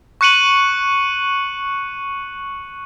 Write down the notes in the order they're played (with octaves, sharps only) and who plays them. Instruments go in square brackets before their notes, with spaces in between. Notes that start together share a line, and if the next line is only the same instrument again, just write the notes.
[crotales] C#6 F#6 C#7 D#7 F#7